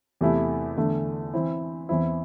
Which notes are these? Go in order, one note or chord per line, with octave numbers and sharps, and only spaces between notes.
E2 C3 A3 E4
E2 D3 A3
E3 C4 E4
E2 E3 C4 E4